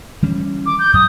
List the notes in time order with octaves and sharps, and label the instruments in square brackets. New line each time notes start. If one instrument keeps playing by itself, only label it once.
[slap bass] E3 G3 C#4
[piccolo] D6
G6
[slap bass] F#2 [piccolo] D#6